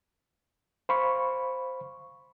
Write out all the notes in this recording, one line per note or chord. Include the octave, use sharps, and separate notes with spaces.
C5 F5 B5 C#6